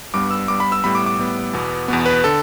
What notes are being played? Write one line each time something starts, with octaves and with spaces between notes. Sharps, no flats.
G2 G3 B3 D6
E6
G2 G3 B3 D6
B5
E6
A2 G3 B3 B5
D6
D6
A2 G3 B3
E2 B2 B3
E2 B2 B3
B4
D3 A4